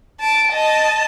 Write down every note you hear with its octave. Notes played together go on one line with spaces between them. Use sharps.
A5 D7
D#5 A5